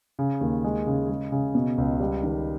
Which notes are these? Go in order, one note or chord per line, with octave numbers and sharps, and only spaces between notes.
C#3
D#2
G#3
C#3
G#3
C#3
B2
C#2
G3
D#3